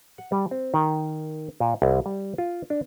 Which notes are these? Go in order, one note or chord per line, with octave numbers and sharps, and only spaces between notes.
F#5
G3
C4
D#3
A#2
C2
G3
F4
D4